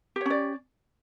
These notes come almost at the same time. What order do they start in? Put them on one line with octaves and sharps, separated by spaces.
G4 C#5 C#4 D5